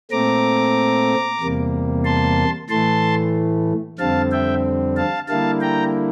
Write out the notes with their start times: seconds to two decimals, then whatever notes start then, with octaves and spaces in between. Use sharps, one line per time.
0.11 A#2 A3 C4 A#5 D6
1.40 E2 C3 G3 A#3
2.05 A5 C6
2.69 A2 E3 A3 A5 C6
3.99 F2 D3 G3 C4 F5 A5
4.32 E5 G5
4.97 F5 A5
5.28 D3 G3 A#3 E4 F5 A5
5.61 G5 A#5